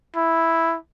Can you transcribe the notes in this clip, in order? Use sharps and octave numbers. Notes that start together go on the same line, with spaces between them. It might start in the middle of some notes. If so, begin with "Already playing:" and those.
E4